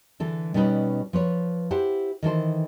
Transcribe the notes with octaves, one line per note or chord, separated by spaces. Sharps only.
D3 E3 A4
B2 G3 B3 C#4 D#4 B4
F3 B4 C#5
E4 G4 C5 F#5
D#3 E3 A4 C5